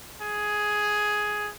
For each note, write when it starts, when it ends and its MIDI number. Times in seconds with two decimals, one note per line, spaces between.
0.22 1.50 68